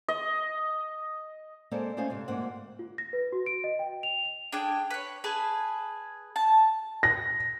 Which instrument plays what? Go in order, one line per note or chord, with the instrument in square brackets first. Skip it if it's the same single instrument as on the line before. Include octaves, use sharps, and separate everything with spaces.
[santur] D#5
[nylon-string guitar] G#3 A#3 C4 A4 D5 F5
A3 C#4 C5 D#5 F5 G#5
G#2 C3
D2 G#2 A#3 C4 F#5
[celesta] F4
A#6
B4
F#4
D7
D#5
G5
F7
F7
[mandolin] D4 G#4 G5
B4 C#5
G#4 B4 G#5 A5
A5
[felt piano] A#6